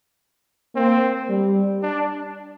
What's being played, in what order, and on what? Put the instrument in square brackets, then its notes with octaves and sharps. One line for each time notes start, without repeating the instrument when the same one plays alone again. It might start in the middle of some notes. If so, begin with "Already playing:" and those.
[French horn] A#3 [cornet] C4
[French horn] G3
[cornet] D4